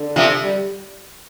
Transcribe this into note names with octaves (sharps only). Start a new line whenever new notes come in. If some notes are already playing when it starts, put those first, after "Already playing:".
Already playing: D3
C3 F3
G3